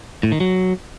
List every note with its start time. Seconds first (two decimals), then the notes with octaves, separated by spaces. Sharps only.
0.23 A2
0.32 D#3
0.40 F#3